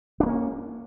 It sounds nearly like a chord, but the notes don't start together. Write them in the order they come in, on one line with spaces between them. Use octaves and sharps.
D4 A3 A#3 C#4